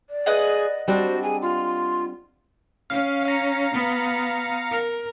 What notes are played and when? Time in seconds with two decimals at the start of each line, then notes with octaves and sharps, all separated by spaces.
0.10 D5
0.26 G#4 B4 D#5 F#5
0.88 G3 C4 D4 F#4 C5
1.23 G#4 G#5
1.42 F4 C6
2.90 C#4 F5
3.26 F5 A#5 C#7
3.74 B3
4.71 A#4